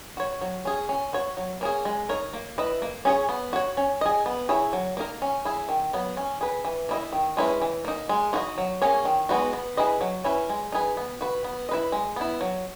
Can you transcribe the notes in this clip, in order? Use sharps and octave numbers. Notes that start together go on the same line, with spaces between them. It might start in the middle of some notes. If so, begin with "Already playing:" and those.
F#4 C#5
F#3
C#4 G#4
C#4
F#4 C#5
F#3
A#3 C#4 G#4
G#3
D#4 A#4 C#5
A#3
E4 B4 D#5
A#3
C#4 G#4 C#5
B3
F#4 C#5
C#4
G#4 D#5
B3
E4 G#4 C#5
F#3
A#3 D#4 A#4
C#4
E4 G#4
D#3
F#3 B3
C#4
G#4 B4
E3
A#3 E4 G#4 D#5
D#3
G#3 C#4 E4 B4
E3
A#3 D#4
G#3
D#4 F#4 B4 D#5
F#3
A#3 C#4 G#4 C#5
D#3
G#3 B3 D#4 F#4
B3
E4 G#4 B4 D#5
F#3
C#4 E4 B4
G#3
D#4 G#4 B4
B3
F#4 B4
B3
E4 B4 D#5
G#3
B3 E4
F#3